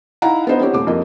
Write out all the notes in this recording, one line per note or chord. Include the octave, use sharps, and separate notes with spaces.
D#4 E4 F5 F#5 A#5
B3 D4 C5 D#5
B3 C4 E4 G4 C#5
D#1 A3 D6
F2 A#3 D#5